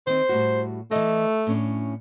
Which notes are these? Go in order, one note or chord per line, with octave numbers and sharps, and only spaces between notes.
D#3 C4 C5
A2 G3 F#4
E3 A3 D#5
A2 C#4 D4